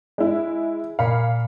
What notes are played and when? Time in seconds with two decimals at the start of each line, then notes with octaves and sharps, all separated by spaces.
0.18 G#3 E4
0.99 A#2 F5 B5 C#7